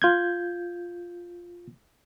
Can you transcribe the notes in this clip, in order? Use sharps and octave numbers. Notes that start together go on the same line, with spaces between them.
F4 G6 G#6